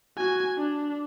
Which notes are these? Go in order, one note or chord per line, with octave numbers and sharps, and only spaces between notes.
F#4 G#5
D4